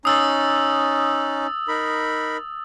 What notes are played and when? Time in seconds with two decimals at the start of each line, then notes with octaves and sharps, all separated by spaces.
0.05 C#4 D#4 D#6 E6 A6
1.68 D#4 A#4 B5